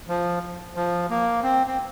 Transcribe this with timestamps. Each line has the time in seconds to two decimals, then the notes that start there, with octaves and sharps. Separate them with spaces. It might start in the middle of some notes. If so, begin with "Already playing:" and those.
0.08 F3
0.76 F3
1.10 A#3
1.43 C4
1.67 C4